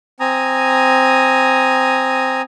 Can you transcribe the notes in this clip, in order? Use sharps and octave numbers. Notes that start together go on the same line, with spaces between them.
C4 G#5 A#5 D#6